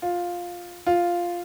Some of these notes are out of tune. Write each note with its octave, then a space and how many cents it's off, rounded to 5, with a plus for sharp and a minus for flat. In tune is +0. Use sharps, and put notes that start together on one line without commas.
F4 +10
F4 +0